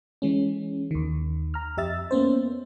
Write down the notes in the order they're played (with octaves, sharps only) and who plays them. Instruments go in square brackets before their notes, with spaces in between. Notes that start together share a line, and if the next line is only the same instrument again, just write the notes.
[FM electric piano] E3 G#3 C#4
D#2 D#3
A#5 F6
F2 G4 D#5 E5 E6 A6
A#3 B3 C#4 C5